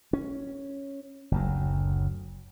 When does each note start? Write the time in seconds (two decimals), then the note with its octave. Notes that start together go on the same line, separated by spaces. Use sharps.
0.13 C#4
1.31 F#1 D2 F#3